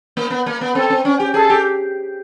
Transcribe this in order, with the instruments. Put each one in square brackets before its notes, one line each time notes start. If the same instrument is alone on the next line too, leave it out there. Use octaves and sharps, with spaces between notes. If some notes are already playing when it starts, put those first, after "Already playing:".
[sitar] A#3
B3
A#3
B3
[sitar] C4 [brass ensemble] A4
[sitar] C4
C#4
G4
[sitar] G#4 [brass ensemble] A4
[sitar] G4